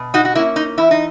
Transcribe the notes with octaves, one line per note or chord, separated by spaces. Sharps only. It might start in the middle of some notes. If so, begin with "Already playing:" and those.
Already playing: B2
D#4 F#4
F#4
A#3 C#4 E4
D#4
E2 E4
D#4